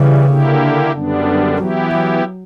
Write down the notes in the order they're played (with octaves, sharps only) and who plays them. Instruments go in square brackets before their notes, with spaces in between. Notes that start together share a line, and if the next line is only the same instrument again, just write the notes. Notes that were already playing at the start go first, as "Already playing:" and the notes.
Already playing: [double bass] C#3 [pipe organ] E3 G3
[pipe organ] D3 A#3 E4 G4
F#2 D3 G3 B3 D4
[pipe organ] E3 B3 E4 G4 [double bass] F#3
[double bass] F#3